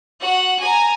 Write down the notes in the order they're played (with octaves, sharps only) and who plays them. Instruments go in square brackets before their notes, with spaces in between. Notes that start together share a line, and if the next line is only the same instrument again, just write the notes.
[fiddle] F#4 F#5
G#5 A#5